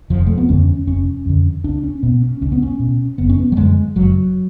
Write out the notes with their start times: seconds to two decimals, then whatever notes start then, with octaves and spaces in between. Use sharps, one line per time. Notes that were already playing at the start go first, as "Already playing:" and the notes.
0.10 F1 F3
0.26 A3
0.38 B3
0.49 F2 D3 C#4
0.87 F1 C#4
1.26 F2 D3
1.64 C#2 D4
1.84 C#4
2.03 B2 B3
2.22 C#4
2.41 C#2 C#4
2.52 B3
2.62 C#4
2.80 B2
3.18 F#1 B3
3.29 C#4
3.39 B3
3.52 F#3
3.57 F#2 D3 G#3
3.96 F#1 F#3